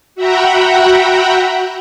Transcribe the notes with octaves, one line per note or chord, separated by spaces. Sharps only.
F#4 E5 F#5 G5 A#5 B5